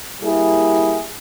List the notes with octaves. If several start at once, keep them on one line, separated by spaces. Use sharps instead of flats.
G3 A#3 E4 G#4